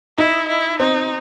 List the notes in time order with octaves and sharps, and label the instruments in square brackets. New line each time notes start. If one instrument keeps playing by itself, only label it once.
[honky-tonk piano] D#4 [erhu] E4
[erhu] E4
[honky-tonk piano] C4 [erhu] D#4